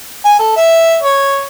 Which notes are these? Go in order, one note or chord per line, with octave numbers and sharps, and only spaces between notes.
G#5
A4
E5
C#5